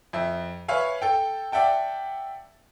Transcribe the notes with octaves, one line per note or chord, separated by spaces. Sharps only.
F2 E5
B4 C#5 E5 F5 G#5
A4 G5
D5 E5 F#5 G5 A5